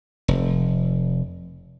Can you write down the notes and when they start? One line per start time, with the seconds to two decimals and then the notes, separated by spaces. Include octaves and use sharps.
0.28 F1